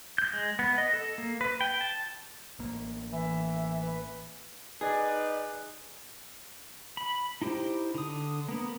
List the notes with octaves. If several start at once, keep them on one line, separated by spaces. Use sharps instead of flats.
G6
G#3
B3
D#5
A4
A#3
B4
G5
A5
A1 A#3
E3 E5
B4
D#4 G#4 B4 D5
B5
D#4 E4 G4 C5
D3 D#6
A#3 B3